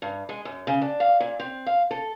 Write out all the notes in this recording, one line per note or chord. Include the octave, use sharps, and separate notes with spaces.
G2
G#3
F#2
C#3
D4
F5
A#2
C4
F5
A4